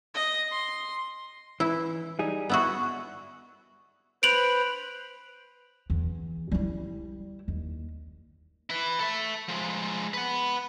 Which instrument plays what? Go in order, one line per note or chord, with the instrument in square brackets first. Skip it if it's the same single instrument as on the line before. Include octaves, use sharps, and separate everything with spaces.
[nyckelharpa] D#5
C6
[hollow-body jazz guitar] E3 [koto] E4
[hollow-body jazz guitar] G3 D#4 G#4
[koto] B3 E4 F#4
[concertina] B4 C5 [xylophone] D7 F7 F#7
[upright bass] E2
G3 E4
D#2
[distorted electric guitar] E4 B4
A4 E5
F3 G#3
B4 F#5